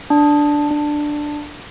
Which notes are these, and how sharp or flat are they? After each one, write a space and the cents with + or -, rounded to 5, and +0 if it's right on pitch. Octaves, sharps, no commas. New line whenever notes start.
D4 +0
D4 +10